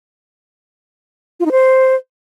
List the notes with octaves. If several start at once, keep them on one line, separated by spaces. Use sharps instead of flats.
F4
D#4
C5